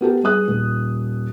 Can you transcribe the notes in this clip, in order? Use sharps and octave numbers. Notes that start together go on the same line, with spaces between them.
B3 G4 A4 A#4
G2 G#4 D#6 F#6
D#1